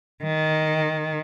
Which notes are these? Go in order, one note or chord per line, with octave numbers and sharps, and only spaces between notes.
D#3